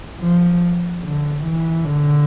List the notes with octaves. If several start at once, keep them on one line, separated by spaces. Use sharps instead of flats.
F3
D3
E3
D3